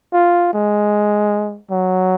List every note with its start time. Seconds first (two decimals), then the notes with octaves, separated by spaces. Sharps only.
0.13 F4
0.53 G#3
1.71 F#3